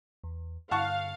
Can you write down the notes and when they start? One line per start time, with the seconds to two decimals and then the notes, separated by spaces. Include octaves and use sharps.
0.24 E2
0.71 G2 D3 F5 F#5 A5 C#6